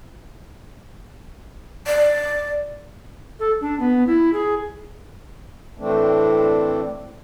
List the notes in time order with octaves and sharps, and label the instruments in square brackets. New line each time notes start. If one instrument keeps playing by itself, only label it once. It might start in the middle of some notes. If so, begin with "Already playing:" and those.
[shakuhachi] D5
[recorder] A4
D4
B3
E4
G#4
[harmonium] A2 E3 A3 C4 D4